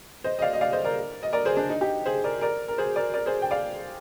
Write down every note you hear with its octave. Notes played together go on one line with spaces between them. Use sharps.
C5 D#5
D#5
D5 F5
D#5
D5 F5
C5 D#5
A#4 D5
D#5
A#4 D5
G#4 C5
D4
D#4
D#4 G4
G#4 C5
A#4 D5
A#4 D5
A#4
G#4 C5
A#4 D5
A#4 D5
G#4 C5
G5
D5 F5